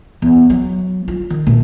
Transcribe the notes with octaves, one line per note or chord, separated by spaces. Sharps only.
E2
F#3
F4
D#3
A#2 A3